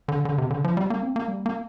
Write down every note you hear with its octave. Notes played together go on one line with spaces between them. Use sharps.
D3
D3
C3
D3
F3
G3
A#3
C4
A#3
G3
A#3